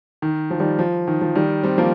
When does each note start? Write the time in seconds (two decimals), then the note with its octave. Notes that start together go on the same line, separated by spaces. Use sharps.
0.22 D#3
0.51 F3
0.60 D#3 G3
0.79 F3
1.08 D#3
1.21 F3
1.35 D#3 G3
1.63 G3 C4
1.78 F3 A#3